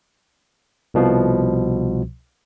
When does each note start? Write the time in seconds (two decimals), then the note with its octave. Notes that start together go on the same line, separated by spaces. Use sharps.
0.94 C2 B2 F3